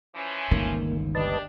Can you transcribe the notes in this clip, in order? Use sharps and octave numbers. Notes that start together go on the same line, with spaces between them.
E3 F3 C#4
G1 C#2 D#3 A#3
D4 G4 B4 D#5 A5